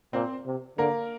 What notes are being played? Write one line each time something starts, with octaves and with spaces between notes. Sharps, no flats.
A#2 C4 C5
C3
D3 A#3 A#4